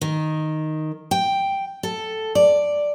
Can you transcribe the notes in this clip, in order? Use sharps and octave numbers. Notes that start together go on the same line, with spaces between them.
D#3
G5
A4
D5